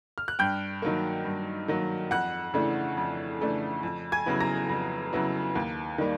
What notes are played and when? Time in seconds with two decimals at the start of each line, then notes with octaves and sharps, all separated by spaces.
0.18 F6
0.28 F#6
0.39 G2 G5 G6
0.82 D#3 F#3 A#3
1.25 G2
1.68 D#3 F#3 A#3
2.11 F2 F#5 F#6
2.54 C#3 E3 A3 D4
2.97 F2
3.41 C#3 E3 A3 D4
3.83 F2
4.12 G#5 G#6
4.26 C#3 F#3 B3 E4
4.41 A#5 A#6
4.69 F2
5.13 C#3 F#3 B3 E4
5.55 D#2
5.98 D#3 G3 A#3